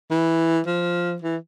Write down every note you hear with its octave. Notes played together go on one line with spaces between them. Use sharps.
E3
F3
E3